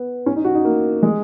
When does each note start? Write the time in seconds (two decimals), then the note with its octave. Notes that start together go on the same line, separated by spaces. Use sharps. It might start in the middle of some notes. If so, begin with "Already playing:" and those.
Already playing: B3
0.26 C#4
0.36 D#4
0.45 F#4
0.55 D#4
0.65 A#3
1.03 G#3